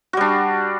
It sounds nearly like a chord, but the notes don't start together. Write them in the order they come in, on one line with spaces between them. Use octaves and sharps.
F#4 G3 D4